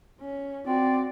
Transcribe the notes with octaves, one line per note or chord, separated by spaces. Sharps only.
C#4
C4 F#4 D5